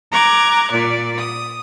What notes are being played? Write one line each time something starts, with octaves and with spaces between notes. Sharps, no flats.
A#5 D6 F#6 G#6 A6
A#2 D5
D#6